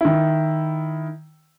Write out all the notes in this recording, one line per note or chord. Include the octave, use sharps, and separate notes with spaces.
D#3 E4